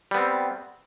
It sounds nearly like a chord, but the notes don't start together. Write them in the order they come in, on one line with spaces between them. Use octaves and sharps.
G3 B3 C4